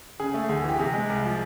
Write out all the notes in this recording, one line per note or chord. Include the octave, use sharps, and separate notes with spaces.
C#3 G#4
A3
D2 G#4
E3
G4
C3 G#4
G#3
C2
F3